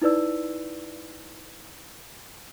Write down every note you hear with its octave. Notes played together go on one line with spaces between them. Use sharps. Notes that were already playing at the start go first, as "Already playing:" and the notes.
D#4 E4 B4 D5 E6